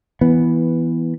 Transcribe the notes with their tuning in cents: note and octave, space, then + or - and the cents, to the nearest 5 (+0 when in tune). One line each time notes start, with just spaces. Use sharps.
E3 +0 B3 -5